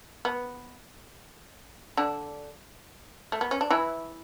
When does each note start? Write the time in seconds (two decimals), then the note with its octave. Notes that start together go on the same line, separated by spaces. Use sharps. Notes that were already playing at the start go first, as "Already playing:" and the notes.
0.25 B3
1.97 D3 D4
3.32 A3
3.41 B3
3.51 C#4
3.61 D4
3.70 E3 E4